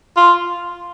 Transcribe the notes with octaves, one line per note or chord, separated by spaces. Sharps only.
F4